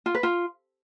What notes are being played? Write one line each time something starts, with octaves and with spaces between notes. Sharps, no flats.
F4
B4
F4